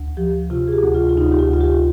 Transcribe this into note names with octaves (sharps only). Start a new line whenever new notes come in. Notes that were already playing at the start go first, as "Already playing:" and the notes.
Already playing: D2
F3 G4
C3 F4
G#4
G4
D2
F4
F4
D2 D#4
G4
F4
D2 F4
G4